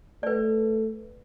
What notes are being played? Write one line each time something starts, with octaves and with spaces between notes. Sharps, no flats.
A3 B4 D5